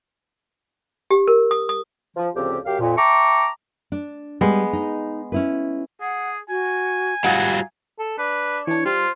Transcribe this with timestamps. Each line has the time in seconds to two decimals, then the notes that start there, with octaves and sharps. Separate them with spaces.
1.11 G4
1.28 A#4
1.51 D#6
1.69 D#6
2.17 F3
2.35 D2 C#3 F3 C4 G4
2.66 F#2 G4 F5
2.80 F2 A#2
2.97 E5 G5 A5 A#5 C#6 D6
3.92 D4
4.41 G3 G#3 B3 B4
4.73 D#4
5.32 C#4 E4 B4
6.01 G#4 F#5
6.49 F#4 G#5
7.24 G#2 G3 F4 F#4 F5 F#5
7.99 A4
8.18 D4 B4
8.67 E3 D4 C#5
8.86 G3 F4 C5